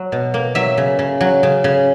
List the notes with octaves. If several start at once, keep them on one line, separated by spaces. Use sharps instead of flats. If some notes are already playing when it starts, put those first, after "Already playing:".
Already playing: F#3
B2
A#3
F#3 E5
C#3
C#3
F#3
C#3
C#3